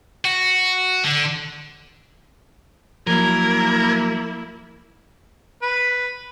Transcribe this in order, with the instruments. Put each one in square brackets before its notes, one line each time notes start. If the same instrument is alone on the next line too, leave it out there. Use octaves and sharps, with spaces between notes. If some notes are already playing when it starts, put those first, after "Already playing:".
[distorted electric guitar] F#4
D3
[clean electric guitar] F3 F#3 [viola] A#3 E4 [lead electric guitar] A#4 [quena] G#6
[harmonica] B4